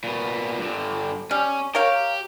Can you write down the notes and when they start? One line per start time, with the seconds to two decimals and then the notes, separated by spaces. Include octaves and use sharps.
0.04 A#2 B3
0.59 G2 D3
1.31 G3 C#4
1.75 G4 A#4 C#5 F5